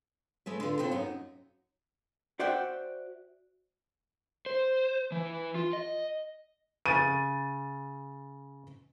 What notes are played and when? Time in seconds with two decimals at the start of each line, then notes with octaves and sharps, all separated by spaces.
0.46 G#3 A3 B4
0.60 D3 F4
0.79 B2 C4 F4 F#4 A4 C5
0.91 F#2 D#4 F#4
2.39 F#4 C5 D5 E5 F#5 G5
4.46 C5
5.12 E3
5.55 F4
5.73 D#5
6.86 C#3 A6 D#7